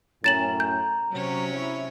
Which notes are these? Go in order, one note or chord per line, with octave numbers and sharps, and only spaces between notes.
F#2 A2 C#4 A#5 A6 E7 F#7
G6
C3 F#3 C#4 C#5
E4